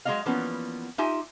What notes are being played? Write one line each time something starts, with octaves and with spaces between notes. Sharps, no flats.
F#3 G#3 A#3 D4 D#5 F5
E3 F3 G3 A#3 B3 C#4
D#4 F4 G4 E5 G#5